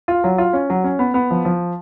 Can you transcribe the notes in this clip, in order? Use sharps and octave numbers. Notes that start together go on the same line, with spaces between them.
F4
F#3
F4
C#4
F#3
C#4
B3
B3
F3
F3